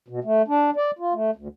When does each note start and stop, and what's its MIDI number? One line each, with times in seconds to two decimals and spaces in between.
0.08 0.20 47
0.24 0.42 57
0.48 0.70 62
0.76 0.91 74
0.99 1.13 65
1.13 1.31 57
1.36 1.48 38